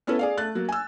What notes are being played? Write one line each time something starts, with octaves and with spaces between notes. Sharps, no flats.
B3 C#4 E4 A4 B4
G#4 D5 F5
A3 F#6 A6
F#3 A#3
G#5 E6